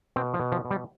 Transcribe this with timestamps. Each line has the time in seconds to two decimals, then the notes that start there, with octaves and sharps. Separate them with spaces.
0.16 B2 C4
0.34 F3
0.40 B2
0.52 F3
0.65 B2
0.71 G3